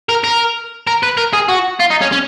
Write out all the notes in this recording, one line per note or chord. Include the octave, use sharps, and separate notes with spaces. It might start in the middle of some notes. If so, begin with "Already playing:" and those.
A#4
A#4
A#4
B4
A#4
G#4
F#4
F4
D#4
C#4
C#4